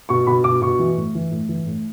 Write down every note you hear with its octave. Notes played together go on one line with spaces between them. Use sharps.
B2 C#6
B2 B5
B2 D6
B2 C#6
E3
A2
E3
A2
E3
A2